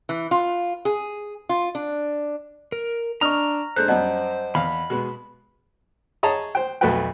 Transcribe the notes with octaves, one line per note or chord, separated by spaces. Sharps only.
E3
F4
G#4
F4
D4
A#4
D4 D#5 A#5 C#6 D#6 F6 F7
G#3 D4 A4 C5 F#6 G6
F#2 G3 D#5 F#5 A5
E2 F5 B5
B2 G#3 B3
G#4 C#5 D#5 A5 A#5
C5 G5
B1 F2 A3 F#4 B4 G5